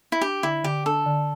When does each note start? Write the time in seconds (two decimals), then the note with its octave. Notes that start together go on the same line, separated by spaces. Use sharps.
0.12 E4
0.21 D4 G4
0.43 D3 E4
0.64 D3 G4
0.86 D4 A4
1.06 D3